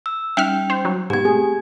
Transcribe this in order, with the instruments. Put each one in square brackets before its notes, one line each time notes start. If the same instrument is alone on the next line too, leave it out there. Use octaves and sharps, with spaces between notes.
[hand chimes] E6
[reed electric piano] G3 C#4 D#4 [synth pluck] E5 F#5 F6 [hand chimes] G5
[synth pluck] C5
F#3
[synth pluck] G#2 B2 [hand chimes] G4 G#6
[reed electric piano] A3 C4 [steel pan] G#4